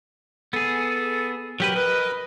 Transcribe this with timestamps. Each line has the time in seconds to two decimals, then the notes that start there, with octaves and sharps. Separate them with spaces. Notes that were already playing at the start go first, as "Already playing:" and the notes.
0.53 B3 G#4 A4
1.60 F#3 G4 A#4 B4
1.76 B4 D#5